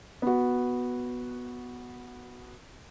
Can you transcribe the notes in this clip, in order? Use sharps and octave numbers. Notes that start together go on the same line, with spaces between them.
B3 F#4